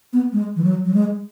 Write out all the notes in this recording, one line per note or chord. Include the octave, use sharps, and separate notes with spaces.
B3
G#3
E3
F#3
F#3
G#3